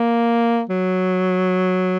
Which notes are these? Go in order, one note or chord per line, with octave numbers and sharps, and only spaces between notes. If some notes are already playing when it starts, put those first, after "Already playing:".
Already playing: A#3
F#3